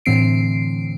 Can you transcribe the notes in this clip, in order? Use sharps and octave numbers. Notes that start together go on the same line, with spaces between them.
A2 D3 E3 C4 C7 D7